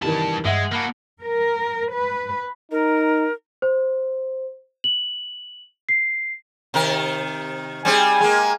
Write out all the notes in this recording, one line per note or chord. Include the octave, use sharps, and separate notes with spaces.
G2 C3 D#3 E3 A5
G2 G#3 E5 F#5
A#3 F#4 A5 B5 F#6
A#4
B4
D#4 A#4
C5
F#7
C7
C3 D#3 A#4
G3 C4 G#4 G#5
G#3 A#3